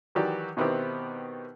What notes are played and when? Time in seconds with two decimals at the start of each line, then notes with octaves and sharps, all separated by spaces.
0.15 D#3 E3 F#3 F#4 G4 D5
0.57 B2 D#3 B3 C4 E4 G4